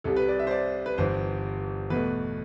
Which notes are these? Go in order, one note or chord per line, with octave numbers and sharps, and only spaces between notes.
C2 C3 G3 A4
B4
D5
E5
C5
D5
B4
G1 G2 E3 C5
E2 B2 A3 B4